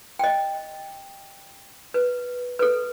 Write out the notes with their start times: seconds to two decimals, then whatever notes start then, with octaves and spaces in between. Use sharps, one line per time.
0.19 D#5 G5
1.94 B4
2.59 A4 B4